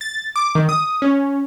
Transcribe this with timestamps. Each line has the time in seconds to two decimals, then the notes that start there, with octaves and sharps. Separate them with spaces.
0.01 A6
0.36 D6
0.55 D#3
0.69 D#6
1.02 C#4